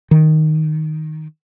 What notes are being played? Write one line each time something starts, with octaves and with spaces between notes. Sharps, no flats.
D#3